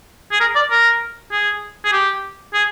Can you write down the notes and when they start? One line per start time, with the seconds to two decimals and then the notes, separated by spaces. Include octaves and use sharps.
0.32 G#4
0.41 A#4
0.56 D5
0.71 A#4
1.32 G#4
1.85 G#4
1.92 G4
2.54 G#4